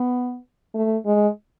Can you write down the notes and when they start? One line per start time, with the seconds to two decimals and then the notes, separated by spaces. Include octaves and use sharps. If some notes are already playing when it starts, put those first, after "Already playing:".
Already playing: B3
0.75 A3
1.06 G#3